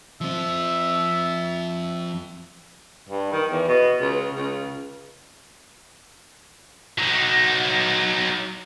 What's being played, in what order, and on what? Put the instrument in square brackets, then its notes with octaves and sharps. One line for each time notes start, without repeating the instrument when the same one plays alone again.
[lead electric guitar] F3 C4 [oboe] E5
[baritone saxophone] G2
D#3
E2
B2
C#2
C#2
[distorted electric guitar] F#3 D#4